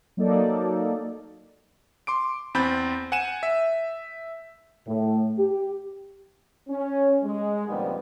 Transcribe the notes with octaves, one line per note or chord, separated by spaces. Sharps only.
F#3 A#3 D#4 A4 D5
C6 D6 D7
E2 C4 B5 G6 A6
F#5 G#5 D#7 E7
E5
A2
G4
C#4
G#3
A#1 F2 D#3 G3 B3